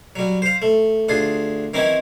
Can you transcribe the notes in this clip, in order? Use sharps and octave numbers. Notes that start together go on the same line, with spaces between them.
F#3 G3
C5 F5
A3
D2 D4 F4 G#4
D#3 E3 C4 C#4 D#4 E4